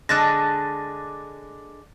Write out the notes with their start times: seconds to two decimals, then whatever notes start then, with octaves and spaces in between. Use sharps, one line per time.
0.09 D3 G#3 D4 F#6 A6 A#6